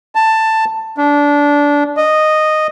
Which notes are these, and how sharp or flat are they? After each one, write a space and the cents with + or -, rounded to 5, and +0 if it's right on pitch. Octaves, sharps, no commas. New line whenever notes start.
A5 +10
D4 -20
D#5 -10